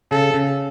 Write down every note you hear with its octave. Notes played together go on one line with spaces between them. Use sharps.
C#3 A4
C#3